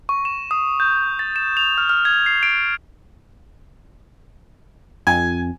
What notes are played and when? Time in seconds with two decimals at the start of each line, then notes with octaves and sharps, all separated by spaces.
0.09 C#6
0.25 E7
0.51 D#6
0.80 G6
1.19 A6
1.36 E7
1.57 F7
1.78 F6
1.89 F6
2.05 G#6
2.26 C7
2.43 D7
5.07 F2 G#5